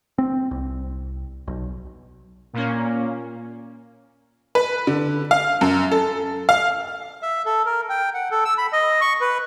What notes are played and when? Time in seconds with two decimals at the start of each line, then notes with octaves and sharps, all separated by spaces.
0.18 C4
0.51 C2
1.47 B1
2.53 A#2 A#3 C#4
4.55 B4
4.87 D3
5.31 F5
5.61 F#2
5.92 A4
6.49 F5
7.22 E5
7.46 A4
7.66 A#4
7.89 G5
8.14 F#5
8.31 A4
8.45 E6
8.58 B5
8.72 D#5
9.01 C#6
9.21 B4